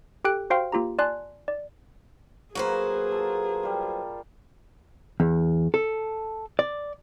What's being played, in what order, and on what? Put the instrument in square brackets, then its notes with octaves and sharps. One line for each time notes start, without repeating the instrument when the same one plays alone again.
[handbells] G4 A4 G5 F#6 D7
F#4 C5 F5 G5 C6 F6
A#3 F4 G4 A#5
D5 G#5 A5 C6 F#6
D5
[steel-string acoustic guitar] F#3 B4 C5 [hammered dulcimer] A#3 F#4 [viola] G#4
[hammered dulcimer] F4 A4 A#4
G3 F4
[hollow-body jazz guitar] E2
A4
D5